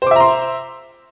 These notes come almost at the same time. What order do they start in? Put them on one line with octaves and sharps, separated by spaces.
C5 D6 E5 A#5 C6